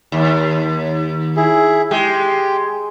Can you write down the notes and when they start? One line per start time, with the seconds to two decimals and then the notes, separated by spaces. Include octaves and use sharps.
0.12 D#2
1.37 E4 G#4
1.91 G#3 G4 G5